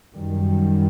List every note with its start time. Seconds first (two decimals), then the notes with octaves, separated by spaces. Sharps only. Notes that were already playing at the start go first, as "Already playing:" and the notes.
0.14 F#2 D#3 G3